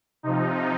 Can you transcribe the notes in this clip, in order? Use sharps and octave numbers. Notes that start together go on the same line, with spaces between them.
C3 F3 D#4